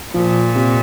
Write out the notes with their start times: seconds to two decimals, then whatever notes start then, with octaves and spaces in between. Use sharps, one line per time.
0.14 A#2 F3
0.55 C3